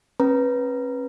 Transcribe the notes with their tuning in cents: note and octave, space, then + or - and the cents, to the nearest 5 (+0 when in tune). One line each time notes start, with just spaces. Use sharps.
C#4 -35 B4 -10 A#5 +5